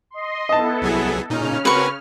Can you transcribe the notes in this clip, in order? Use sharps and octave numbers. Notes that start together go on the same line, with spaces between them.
D#5 C6
B3 E4 A4 D#5 A5
C2 F#3 G#4
A#2 C#3 C#4 D#4 F6
C4 F#4 A#4 B4 C#6